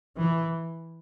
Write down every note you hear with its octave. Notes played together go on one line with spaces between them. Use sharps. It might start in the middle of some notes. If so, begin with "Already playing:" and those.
E3